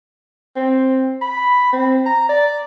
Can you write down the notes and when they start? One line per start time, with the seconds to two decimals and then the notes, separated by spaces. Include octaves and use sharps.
0.56 C4
1.22 B5
1.73 C4
2.06 A#5
2.29 D5